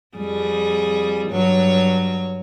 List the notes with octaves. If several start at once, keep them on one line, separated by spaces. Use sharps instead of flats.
F2 G3 G#4
G2 F#3 C#5